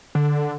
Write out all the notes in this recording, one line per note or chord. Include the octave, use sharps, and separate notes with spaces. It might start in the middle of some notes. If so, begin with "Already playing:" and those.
D3